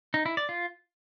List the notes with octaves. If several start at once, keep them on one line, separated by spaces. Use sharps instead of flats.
D#4
E4
D5
F4